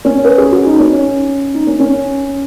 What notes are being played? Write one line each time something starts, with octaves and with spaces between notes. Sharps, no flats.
C#4
B4
G#4
F#4
D#4
C#4
D#4
C#4
C#4